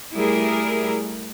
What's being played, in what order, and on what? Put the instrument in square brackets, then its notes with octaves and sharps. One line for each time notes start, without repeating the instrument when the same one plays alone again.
[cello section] G3 A3 E4 G#4 A#4